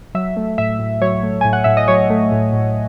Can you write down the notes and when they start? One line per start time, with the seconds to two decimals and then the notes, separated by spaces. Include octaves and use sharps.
0.15 F#3 E5
0.37 A3
0.58 A2 E5
0.79 A2
1.02 F#3 C#5
1.23 A3
1.41 A2 G#5
1.53 F#5
1.64 A2 E5
1.77 D#5
1.88 F#3 C#5
2.10 A3
2.32 A2
2.53 A2